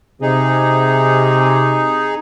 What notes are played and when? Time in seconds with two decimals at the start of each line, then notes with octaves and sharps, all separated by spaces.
0.22 C3 D#4 G#4